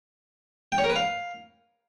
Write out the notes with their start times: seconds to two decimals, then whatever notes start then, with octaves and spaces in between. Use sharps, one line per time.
0.72 G5
0.78 C#5
0.84 A#4
0.90 B4
0.96 F5